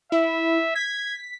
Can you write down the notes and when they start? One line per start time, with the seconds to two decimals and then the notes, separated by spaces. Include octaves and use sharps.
0.12 E4 E5
0.75 G#6 B6